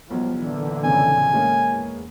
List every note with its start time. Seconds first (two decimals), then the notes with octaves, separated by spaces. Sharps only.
0.10 B1 F3 G3
0.42 A#2 D3 E3
0.84 F2 C#3 G#5
1.33 G#3 A#3 C#4
1.68 E2